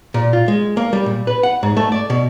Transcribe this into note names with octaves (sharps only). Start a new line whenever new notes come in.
A#2
F4
G#3
A#3
G3
A#2
B4
F#5
G#2
A3
D5
B2